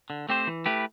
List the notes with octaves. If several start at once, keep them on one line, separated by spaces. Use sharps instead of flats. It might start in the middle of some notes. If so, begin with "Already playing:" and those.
D3
A3 C4 G4 C5
E3
A3 E4 G4 B4